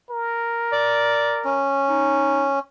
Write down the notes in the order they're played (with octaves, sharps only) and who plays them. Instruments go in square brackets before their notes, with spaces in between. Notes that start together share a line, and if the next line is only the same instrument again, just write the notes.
[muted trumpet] A#4
[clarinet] D5
[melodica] C#4
[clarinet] D#4